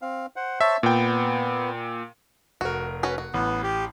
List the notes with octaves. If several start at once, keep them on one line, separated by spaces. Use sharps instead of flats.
C4 F5
C5 F#5
C5 C#5 E5 A5
A#2 B3 G5
F1 F#4 A#4
C#4 F#4 B4
F#4
A1 B3
G4